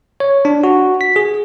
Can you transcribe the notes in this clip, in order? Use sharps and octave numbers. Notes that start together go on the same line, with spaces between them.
C#5
D4
F#4
B6
G#4